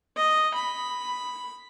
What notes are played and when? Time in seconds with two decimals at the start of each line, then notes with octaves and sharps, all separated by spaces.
0.17 D#5
0.54 B5